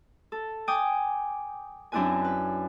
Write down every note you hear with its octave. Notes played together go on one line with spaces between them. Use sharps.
A4
G5 G#5 D6 D#6
F#2 C4 D4 E4 B4 G#5
B4